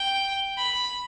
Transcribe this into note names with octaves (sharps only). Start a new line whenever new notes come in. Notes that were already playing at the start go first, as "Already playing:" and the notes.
Already playing: G5
B5